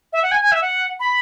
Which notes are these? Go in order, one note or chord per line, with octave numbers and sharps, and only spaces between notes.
E5
F#5
G#5
G#5
E5
F#5
B5